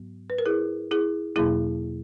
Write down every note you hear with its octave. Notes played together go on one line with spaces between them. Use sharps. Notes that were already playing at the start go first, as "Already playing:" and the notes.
Already playing: G#2 F#3 B3
B4
A#4
E4 G#4
E4 G#4
E2 B2 F#3 A#3 E4 G#4